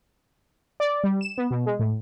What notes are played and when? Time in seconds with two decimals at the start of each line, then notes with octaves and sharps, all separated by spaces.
0.80 D5
1.04 G3
1.21 E7
1.37 B3
1.50 B2
1.66 G#3
1.79 A2